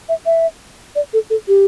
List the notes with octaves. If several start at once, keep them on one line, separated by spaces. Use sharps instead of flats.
E5
E5
D5
A4
A4
G4